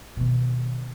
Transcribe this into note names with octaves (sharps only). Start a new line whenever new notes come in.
B2 D#3